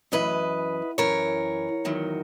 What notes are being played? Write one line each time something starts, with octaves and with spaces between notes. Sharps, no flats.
F#2 E3 B4 D#5
F#2 E3 A#4 C#5
E2 D#3 F#3